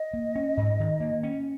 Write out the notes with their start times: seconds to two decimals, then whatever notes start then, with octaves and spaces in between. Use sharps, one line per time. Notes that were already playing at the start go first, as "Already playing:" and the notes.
Already playing: D#5
0.13 A#3
0.35 C#4
0.57 G#2
0.80 D#3
1.00 A#3
1.23 C#4